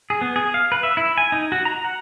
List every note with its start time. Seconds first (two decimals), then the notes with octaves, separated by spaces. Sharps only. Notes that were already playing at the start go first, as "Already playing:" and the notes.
0.10 G#4
0.21 B3
0.36 G#4
0.54 F5
0.72 B4
0.83 E5
0.97 E4
1.17 G#5
1.32 D#4
1.52 F#4
1.65 A#5
1.84 F#5